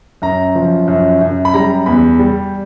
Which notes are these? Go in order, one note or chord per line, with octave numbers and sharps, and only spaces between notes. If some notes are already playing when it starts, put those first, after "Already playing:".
F#2 A#5
F3
F#2
F#2
B5
G3 A#5
E2 B5
G3